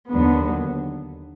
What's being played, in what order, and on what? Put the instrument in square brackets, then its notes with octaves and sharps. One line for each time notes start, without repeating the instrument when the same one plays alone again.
[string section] D#2 D3 F#3 B3